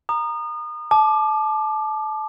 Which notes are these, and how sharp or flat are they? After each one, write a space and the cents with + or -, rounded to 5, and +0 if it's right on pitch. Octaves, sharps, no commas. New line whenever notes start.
A#5 +0 D#6 -30
A5 -25 D6 +20